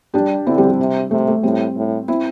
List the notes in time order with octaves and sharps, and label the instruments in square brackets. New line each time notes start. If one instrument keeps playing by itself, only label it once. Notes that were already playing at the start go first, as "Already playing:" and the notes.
[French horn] G3 [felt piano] D4 G4
[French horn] D3 [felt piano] C4 E4
[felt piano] G3 C4
G3
[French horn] C3
[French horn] C3 [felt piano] A3
[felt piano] A3
[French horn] A2 [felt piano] G3 C4
[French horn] A2
[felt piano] C4 E4